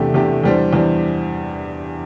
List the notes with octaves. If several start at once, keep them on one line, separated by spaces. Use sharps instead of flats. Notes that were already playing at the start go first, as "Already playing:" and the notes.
Already playing: E2 C3 A3 D4 G4
E2 C3 A3 D4 G4
E2 E3 G3 D4 C5
E2 E3 G3 D4 C5